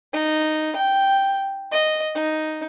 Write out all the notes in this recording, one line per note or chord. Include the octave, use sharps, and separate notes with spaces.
D#4
G5
D#5
D#4